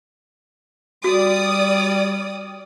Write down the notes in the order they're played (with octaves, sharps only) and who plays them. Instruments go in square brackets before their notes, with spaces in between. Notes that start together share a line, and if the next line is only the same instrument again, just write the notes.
[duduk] G3 [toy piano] F#4 [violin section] D5 D#6